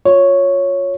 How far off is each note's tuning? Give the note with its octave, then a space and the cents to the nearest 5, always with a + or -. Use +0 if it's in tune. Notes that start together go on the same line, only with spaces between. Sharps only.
F4 +20 C#5 +0